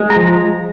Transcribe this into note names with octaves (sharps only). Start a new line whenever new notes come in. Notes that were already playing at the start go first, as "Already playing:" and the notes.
Already playing: G#3
A#5
F3